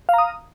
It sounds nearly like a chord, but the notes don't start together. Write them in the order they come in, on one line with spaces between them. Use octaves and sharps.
F5 A#5 D#6